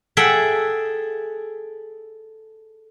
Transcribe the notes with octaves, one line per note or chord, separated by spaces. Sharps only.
G#4 A4 E5 F#5 G5